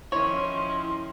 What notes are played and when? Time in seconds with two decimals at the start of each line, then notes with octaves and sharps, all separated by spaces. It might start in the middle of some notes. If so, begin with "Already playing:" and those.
0.12 D#3 F3 C#4 E4 C#5 C6